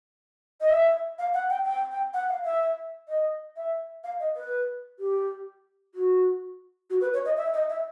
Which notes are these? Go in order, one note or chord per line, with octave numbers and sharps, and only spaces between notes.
D#5
E5
F5
F#5
G5
G5
G5
F#5
F5
E5
D#5
E5
F5
D#5
B4
G4
F#4
F#4
B4
C#5
D#5
E5
D#5
E5